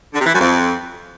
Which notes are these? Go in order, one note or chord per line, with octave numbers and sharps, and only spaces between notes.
D3
C3
E3
F#2
F2